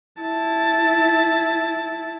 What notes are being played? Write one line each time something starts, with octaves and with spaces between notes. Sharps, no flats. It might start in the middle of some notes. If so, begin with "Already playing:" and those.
E4 A5